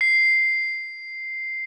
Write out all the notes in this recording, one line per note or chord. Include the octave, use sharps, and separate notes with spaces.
C7